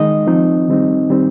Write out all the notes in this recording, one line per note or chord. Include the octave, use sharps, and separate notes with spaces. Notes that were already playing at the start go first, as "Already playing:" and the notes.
Already playing: D#3 G#3 D#4 D#5
F3 C4 D#4
D#3 G3 C4 D#4
D#3 G3 C4 D#4